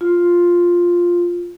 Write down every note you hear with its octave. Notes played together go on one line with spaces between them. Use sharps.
F4